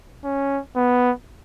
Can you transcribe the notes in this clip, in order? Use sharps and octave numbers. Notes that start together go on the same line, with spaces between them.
C#4
B3